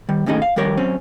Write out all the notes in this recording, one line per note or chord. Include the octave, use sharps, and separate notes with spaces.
D#3 G3
D#2 A2 C#4 D#4 G#4
F5
F2 D#3 G3 A#4 C#5
F#2 C4 C#4